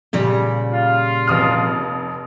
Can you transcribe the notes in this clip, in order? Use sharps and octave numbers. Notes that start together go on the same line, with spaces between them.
A#2 C#3 G3
F4
F1 D#6 F6